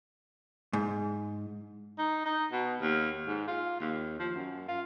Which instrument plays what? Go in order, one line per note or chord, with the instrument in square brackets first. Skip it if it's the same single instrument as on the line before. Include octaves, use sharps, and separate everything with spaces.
[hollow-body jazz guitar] G#2
[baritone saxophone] D#4
D#4
B2
D#2
G#2
F4
D#2
F3
F#2
F4